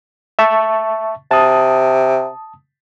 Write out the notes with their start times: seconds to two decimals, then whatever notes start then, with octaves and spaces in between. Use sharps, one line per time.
0.39 E5 A5 C#6
1.31 C3 A5 D#6